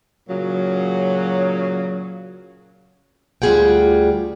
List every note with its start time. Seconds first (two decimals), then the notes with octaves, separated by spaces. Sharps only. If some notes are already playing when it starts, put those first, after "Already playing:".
0.29 A#2 C#3 F#3
3.42 D2 G3 F4 G#4 F#5 G5